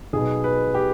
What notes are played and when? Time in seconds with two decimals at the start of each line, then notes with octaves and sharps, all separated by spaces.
0.13 B1 B2 G#4
0.44 B4
0.74 G4